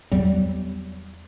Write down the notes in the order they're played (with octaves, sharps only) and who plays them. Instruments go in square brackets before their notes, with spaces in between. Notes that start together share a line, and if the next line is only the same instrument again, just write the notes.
[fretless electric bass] E2 F#3 G3